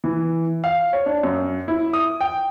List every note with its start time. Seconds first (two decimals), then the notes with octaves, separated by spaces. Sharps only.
0.04 E3
0.64 F5
0.93 C#5
1.06 D4
1.23 F#2
1.68 E4
1.93 D#6
2.21 G5